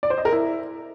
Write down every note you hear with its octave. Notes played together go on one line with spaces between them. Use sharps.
D5
C5
D#5
A#4
E4